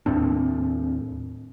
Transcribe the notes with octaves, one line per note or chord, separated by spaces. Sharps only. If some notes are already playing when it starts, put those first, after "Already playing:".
D#2 A2 C4 D4